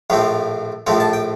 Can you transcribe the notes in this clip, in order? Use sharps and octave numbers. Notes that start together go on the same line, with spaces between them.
A#1 A2 F3 A3 C4 F5
A#1 A2 F3 A3 C4 F5
A5
G5